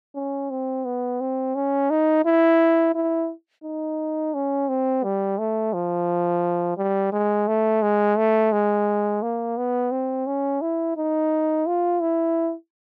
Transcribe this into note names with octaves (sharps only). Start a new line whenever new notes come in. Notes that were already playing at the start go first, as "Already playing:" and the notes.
C#4
C4
B3
C4
C#4
D#4
E4
E4
D#4
C#4
C4
G3
A3
F3
G3
G#3
A3
G#3
A3
G#3
A#3
B3
C4
C#4
E4
D#4
F4
E4